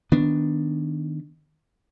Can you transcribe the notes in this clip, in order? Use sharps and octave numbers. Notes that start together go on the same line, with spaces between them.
D#3 B3 D4